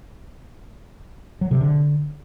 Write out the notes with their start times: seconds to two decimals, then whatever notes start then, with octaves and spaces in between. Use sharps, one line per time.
1.41 F#3
1.51 C3
1.61 D3